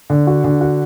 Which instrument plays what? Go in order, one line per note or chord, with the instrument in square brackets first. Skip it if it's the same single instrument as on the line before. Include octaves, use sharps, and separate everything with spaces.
[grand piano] D3
F#4
D3
F#4